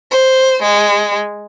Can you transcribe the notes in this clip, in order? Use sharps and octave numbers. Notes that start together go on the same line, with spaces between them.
C5
G#3